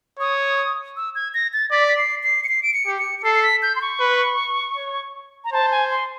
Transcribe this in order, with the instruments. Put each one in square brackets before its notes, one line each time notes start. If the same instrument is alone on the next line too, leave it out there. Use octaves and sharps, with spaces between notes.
[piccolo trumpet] C#5 [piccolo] D#6
[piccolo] E6
G#6
A#6
A6
[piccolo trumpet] D5 [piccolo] B6
[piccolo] B6
C7
C7
C#7
C7
D7
C#7
[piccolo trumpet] G4
[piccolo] C#7
C#7
[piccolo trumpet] A4 [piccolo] C7
[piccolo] C7
B6
G6
C6
C#6
[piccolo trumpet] B4
C#5
[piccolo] A#5
[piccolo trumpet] C5 [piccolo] A5
[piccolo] G#5
C6